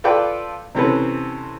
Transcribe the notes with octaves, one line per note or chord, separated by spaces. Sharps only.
F4 A4 B4 D5 G5
C3 E3 C4 C#4 A4 B4